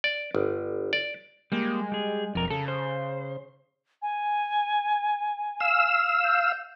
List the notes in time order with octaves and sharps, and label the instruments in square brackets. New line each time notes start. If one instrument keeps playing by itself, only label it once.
[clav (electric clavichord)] D5
G1
D5
[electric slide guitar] G3 A#3 [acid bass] G#3
[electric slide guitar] G3 G#4
[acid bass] E1 [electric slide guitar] F2 A#4
[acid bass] C#3 [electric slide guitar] A4
[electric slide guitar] C5
[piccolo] G#5
[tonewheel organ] F5 E6
[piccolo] G6